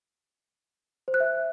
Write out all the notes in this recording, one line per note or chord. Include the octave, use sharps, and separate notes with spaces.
C5
F#6
E5